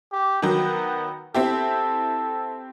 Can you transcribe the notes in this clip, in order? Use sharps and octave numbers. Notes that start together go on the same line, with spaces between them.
G4
D#3 F#3 B3
C4 E4 G4 A4